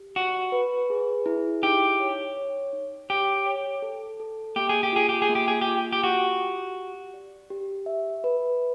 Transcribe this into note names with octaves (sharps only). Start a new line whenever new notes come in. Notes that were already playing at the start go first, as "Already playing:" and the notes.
Already playing: G4
F#4 D5
B4
G#4
E4
D#4 G4
C#5
C#5
D#4
G4 C#5
C#5
A4
A4
A#3 G4
G#4
G4
F4 G#4
G4
G#4
A#3
G4
G#4
G4
F4
G4
F#4 G4
G4
G4
D5
G4
E5
B4